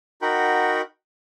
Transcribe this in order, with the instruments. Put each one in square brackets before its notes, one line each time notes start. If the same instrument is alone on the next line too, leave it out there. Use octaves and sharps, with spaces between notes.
[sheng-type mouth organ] D#4 F#4 A#4 F#5 G5 B5